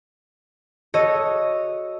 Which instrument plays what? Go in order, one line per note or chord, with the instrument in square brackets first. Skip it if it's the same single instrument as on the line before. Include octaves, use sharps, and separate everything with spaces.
[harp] F#4 A4 C#5 D#5